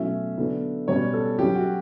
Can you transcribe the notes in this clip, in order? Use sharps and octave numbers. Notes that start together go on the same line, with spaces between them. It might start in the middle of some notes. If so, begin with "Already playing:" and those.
Already playing: B2 F#3 A3 C#4 E4 E5
D3 F#3 B3 E4
B2 G3 C#4 C#5
A4
F#3 C#4 E4 G4
F#4